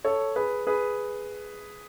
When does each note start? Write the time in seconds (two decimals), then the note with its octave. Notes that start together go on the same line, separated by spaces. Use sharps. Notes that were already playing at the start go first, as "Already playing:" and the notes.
0.05 A4 C#5
0.36 G#4 B4
0.67 G#4 B4